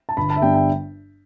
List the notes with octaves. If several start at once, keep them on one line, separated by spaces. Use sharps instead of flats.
A5
G1 B5
A5
E5
G2 G3 B3 D4 G5
G5